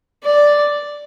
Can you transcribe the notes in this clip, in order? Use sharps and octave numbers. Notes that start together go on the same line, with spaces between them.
D5